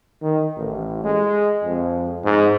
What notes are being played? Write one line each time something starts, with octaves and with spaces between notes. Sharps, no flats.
D#3
A1
G#3
F2
G#2